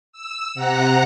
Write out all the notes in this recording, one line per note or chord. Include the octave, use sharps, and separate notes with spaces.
E6
C3 F#5 A#5 F#6